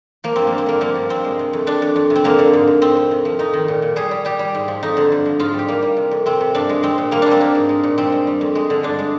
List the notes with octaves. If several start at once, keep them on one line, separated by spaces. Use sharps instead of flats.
F3 A#3
G2 C4
A#3
G2
C4
D3 A#3
F3 A#3
G2
G2 C4
G#3
C3
F2
F2 D4
F2
F2
C3
C4
D3 A#3
D3
G#2
G#2
F2 C4
F2
C3
F3
F2 D#4
D#3
A#2
A#2
G3 G#4
G3
G3 G4
G3
G#2
F3
F2 D#4
D3
G2
F3
G#2 F4
G3
G4
G3 A#3
G3
C3
F2
C3 C4
C3
G2 D4
G#3
G#3 C4
A#2
G3 A#3
G3 D4
C4
G3 A#3
G#2
G#3
A#2
G2 C4
G#3
G3
F2
G#3
D3
G2 D4
G#3